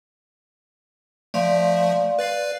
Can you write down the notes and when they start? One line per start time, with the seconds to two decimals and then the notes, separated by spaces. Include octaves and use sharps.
1.34 F3 A3 D5 F5 C6
2.19 B4 D5 F5